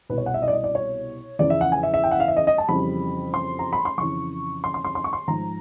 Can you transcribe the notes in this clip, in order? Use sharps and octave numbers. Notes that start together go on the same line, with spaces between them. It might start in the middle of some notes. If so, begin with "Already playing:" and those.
C2 B2 G3 B4
C#5
F#5
E5
D#5
D5
D#5
D5
C#5
E2 C#3 F3 D5
E5
F#5
G#5
E5
E5
G5
F#5
F5
E5
D#5
D#5
A5
F2 C#3 E3 G3 B5
C6
A#5
B5
C6
F2 C#3 E3 C#6
C6
C6
C6
C6
C#6
C6
G#2 F3 A#5